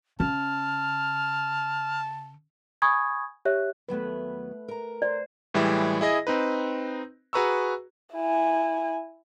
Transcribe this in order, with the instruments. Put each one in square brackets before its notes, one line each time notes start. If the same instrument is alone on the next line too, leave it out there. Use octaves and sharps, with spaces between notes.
[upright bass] C#3 [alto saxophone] A5 [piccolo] F6
[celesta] G#5 B5 C#6 D#6 G#6
G4 C#5 E5 F#6
[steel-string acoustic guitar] D#2 F#3 B3 [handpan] A3 B4
[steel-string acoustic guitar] A#4 A#5
[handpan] C5 [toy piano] D5
[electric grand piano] A2 E3 G3 G#3 E4
E4 G#4 D#5 A#6
C4 D#4 B4
F#4 G#4 B4 A#5 C#6 E6
[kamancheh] E4 G#5